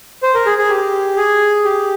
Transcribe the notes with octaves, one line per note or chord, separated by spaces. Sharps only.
C5
A#4
G#4
G#4
G4
G#4
G4